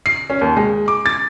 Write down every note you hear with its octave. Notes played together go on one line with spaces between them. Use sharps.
C7
C#4
D#2
G#3
D6
A6